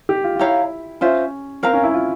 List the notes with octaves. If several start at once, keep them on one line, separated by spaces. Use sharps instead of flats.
G4
F4
F4
E4 G4 C#5 F5 A#5
C#4 F4 C5 E5
C4 A#4 F5 A#5
C#4
E4
F4